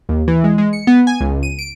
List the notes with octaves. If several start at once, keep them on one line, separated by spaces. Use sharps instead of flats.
D#2
E3
G#3
G#3
C#7
B3
G#5
C#2
D#7
D7